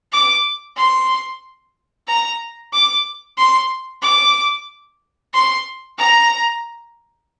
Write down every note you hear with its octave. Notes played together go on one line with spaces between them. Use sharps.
D6
C6
A#5
D6
C6
D6
C6
A#5